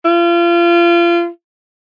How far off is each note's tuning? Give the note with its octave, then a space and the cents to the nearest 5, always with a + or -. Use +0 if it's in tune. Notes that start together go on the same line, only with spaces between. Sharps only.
F4 -30